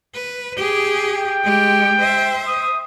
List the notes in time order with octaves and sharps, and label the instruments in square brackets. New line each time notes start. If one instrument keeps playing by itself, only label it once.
[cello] B4
G4 G#4
[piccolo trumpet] G5
[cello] G#3 G4
C5 E5
[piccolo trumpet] D#6